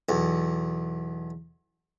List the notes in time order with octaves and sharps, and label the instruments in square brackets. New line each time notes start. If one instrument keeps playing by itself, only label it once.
[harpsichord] B1 E2